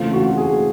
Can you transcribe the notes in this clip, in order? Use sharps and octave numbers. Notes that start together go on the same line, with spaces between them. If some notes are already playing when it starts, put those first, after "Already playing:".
Already playing: C#3 E3 A3 C4 F4
F#4
G#4